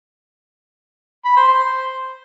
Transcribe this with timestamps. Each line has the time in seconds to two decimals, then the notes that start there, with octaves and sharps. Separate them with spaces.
1.25 B5
1.37 C5
1.48 C5